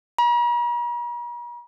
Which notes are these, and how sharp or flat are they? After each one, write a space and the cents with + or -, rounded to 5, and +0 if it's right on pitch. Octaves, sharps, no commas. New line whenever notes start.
A#5 +45